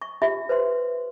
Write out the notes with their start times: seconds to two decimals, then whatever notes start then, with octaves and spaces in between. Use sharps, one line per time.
0.02 C#6
0.22 F4 G4 E5
0.49 B4 C5 E5 C6